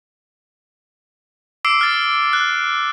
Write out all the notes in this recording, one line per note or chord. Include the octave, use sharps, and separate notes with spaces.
D6 E6 C7 D7
F6 A6
F#6